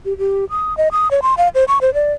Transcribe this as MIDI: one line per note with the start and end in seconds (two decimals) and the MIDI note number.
0.05 0.17 67
0.18 0.45 67
0.50 0.76 87
0.77 0.88 75
0.92 1.11 87
1.11 1.20 73
1.22 1.34 84
1.38 1.48 77
1.55 1.64 72
1.68 1.78 85
1.81 1.93 72
1.94 2.13 74